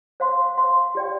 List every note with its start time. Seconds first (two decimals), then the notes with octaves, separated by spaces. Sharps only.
0.20 C5 F5 C6
0.57 C5 F5 C6
0.95 G4 D5 G5